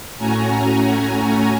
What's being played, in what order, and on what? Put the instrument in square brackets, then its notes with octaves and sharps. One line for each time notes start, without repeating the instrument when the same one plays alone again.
[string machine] A2 A3 C#4 F#4 G#5 A#5